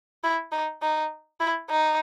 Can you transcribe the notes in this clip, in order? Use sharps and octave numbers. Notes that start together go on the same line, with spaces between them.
E4
D#4
D#4
E4
D#4